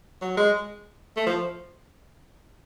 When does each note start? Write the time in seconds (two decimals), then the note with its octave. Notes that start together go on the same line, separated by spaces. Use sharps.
0.22 F#3
0.37 G#3
1.16 A3
1.26 F3